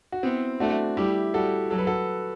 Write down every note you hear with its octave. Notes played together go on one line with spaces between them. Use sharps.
F#4
B3 C4 E4
A3 D4 F#4
G3 E4 G4
G3 F#4 A4
F#3 A4
B4
F#4 A4